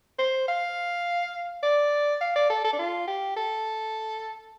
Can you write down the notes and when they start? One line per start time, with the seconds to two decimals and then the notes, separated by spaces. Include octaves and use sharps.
0.19 C5
0.48 F5
1.63 D5
2.21 F5
2.36 D5
2.50 A4
2.64 A4
2.73 D4
2.79 F4
3.07 G4
3.36 A4